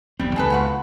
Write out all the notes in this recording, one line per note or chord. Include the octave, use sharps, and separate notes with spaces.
E1 B1 G3 C4
C#2 G#4 A4 B4
B3 F4 F#4